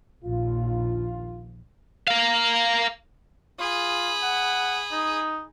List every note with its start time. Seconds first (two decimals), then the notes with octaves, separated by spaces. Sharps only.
0.25 A#1 D#2 F4
2.07 A#4 F5
3.60 F4 G#4 B5
4.23 F#5
4.92 D#4